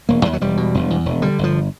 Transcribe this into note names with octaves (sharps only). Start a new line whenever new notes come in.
E1 A#3
D#2 G#3
F#3
E1 G3
B2
E1
E2
E1
D3 G3
G1 F3